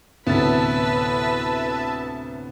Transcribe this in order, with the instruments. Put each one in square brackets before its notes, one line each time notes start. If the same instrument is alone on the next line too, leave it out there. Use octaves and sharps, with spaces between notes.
[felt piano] D2 A2 C3 [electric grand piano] B3 A6 [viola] B4 [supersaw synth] E5 A5